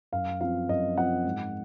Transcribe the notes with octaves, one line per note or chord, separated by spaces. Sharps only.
F#2 F5
F3 C4 F5
F#2 D#5
F3 C4 F#5
G#2